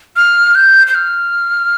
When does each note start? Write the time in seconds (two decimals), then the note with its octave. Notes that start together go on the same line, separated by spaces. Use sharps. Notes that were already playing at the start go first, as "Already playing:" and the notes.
0.16 F6
0.55 G6
0.87 G6
0.95 F6